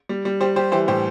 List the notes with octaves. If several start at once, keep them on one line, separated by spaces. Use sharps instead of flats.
G3
G3
G3 G4 C5
G3 G4 C5
E3 G4 C5
A2 G4 C5